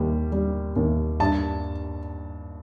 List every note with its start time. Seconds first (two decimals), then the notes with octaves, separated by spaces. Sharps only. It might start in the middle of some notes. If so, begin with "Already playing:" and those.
Already playing: D#2 G3
0.32 G3
0.76 D#2
1.20 G2 A5